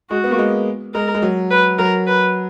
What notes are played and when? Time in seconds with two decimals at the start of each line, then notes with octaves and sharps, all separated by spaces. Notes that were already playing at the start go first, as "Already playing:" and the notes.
0.10 G#3 F#4
0.24 B3
0.31 A#3
0.39 G#3
0.94 G#3 A#4
1.15 G#3
1.22 F#3
1.50 B4
1.78 F#3 A#4
2.07 B4